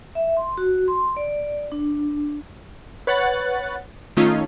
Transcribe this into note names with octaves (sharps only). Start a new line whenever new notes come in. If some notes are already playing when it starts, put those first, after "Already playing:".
E5
C6
F#4
C6
D5
D4
B4 C#5 F#5 F#6 A6
D#3 A3 C#4 D#4 F4